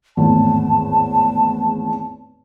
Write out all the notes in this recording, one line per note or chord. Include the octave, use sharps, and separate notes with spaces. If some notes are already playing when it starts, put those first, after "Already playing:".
G#1 E2 A2 A5